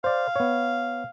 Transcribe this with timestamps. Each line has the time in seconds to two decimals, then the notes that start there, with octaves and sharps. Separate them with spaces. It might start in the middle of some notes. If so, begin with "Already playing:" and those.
0.04 C5 D5 F5
0.36 B3 C#5